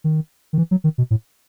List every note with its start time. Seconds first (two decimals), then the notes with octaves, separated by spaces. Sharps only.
0.04 D#3
0.53 D#3
0.58 E3
0.71 F#3
0.84 D#3
0.98 B2
1.11 A2